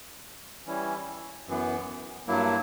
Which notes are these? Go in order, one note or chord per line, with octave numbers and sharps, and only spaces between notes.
E3 G3 C#4 E4
F#2 E3 B3
G2 F#3 A#3 E4